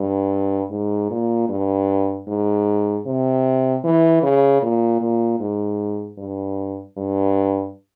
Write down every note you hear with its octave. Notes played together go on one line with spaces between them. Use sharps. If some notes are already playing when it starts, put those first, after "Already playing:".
Already playing: G2
G#2
A#2
G2
G#2
C3
E3
C#3
A#2
A#2
G#2
G2
G2